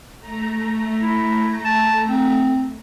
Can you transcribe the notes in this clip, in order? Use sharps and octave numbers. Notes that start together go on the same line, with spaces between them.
A3 A#5
E4
A5
C4